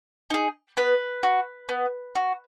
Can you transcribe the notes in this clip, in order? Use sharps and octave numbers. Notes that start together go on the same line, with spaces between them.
D#4 G#4
B3 B4
F#4
B3
F#4